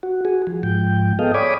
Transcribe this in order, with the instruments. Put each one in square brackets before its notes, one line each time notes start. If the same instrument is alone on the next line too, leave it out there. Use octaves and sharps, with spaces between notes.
[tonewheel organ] F#4
F#4 G#4
F3
G#2 F3 G5
B3 G#4 A4 D#5 F5 G5
C#5 D5 G#5 B5 D6 D#6